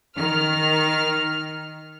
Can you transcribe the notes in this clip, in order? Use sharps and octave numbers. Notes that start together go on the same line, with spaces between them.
D#3 F6